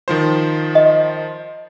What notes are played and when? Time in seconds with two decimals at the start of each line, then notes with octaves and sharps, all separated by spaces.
0.08 D#3 F3 C5
0.75 D#5